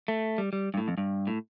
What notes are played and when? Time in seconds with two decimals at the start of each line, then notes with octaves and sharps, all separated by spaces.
0.08 A3
0.38 G3
0.53 G3
0.74 G2
0.77 A2
0.88 F2
0.98 G2
1.27 A2